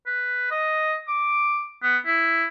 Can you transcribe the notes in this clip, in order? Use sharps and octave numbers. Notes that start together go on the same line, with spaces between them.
B4
D#5
D6
B3
E4